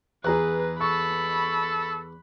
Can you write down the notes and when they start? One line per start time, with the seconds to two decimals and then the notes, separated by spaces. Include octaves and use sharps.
0.24 E2 G#4 B4 A#5 F#6
0.81 A4 B5 C#6